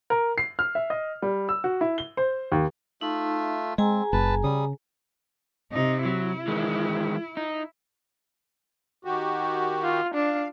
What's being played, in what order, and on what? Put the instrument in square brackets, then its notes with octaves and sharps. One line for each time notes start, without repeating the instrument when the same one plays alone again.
[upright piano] A#4
C7
F6
E5
D#5
G3
E6
F#4
E4
G7
C5
D#2
[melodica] A3 F4 E5 [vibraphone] D#4
[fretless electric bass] G#3 [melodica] C4 [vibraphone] G#4 G#5 A#5
[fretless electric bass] F#1 [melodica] B4 A5
[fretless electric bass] C#3 [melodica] G3 D#6
[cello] C3 D#4
[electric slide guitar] F#3 [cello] E4
[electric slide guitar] D#3 E3 G#3
D#4
[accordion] D#3 F#4 G4
[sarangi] F4
[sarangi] D4 [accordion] F5